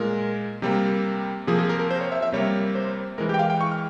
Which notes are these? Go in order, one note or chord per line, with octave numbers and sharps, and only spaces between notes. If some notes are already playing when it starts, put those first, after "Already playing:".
Already playing: A#2 G#3 A#4
C3 G3 A#3
C3 F3 A#3 G#4
G#4
A#4
A#4
C5
C#5
E5
E5
C3 G3 A#3 C#5
C5
E3 G#3 A#4
G4
G5
F5
G5
C#6
F6